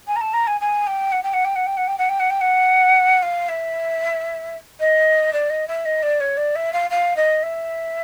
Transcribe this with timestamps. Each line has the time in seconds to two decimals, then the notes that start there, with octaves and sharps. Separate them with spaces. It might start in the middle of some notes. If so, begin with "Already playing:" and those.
0.07 G#5
0.16 A#5
0.20 A5
0.33 A#5
0.47 G#5
0.60 G#5
0.86 G5
1.12 F#5
1.23 G5
1.33 F#5
1.44 G5
1.55 F#5
1.66 G5
1.77 F#5
1.87 G5
1.98 F#5
2.09 G5
2.19 F#5
2.30 G5
2.40 F#5
3.22 F5
3.48 E5
4.79 D#5
5.32 D5
5.49 D#5
5.67 E5
5.85 D#5
6.02 D5
6.20 C#5
6.37 D5
6.55 E5
6.72 F5
6.90 F5
7.16 D#5
7.42 E5